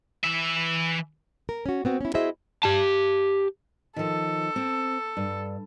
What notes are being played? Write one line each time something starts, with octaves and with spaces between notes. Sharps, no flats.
E3 E5
A#4
C#4 F#4
B3 C4 F#4
C#4 E4
E4 F#4 G#4 C5 D#5 E5
G4 A5
D#3 F3 A4
C4
G2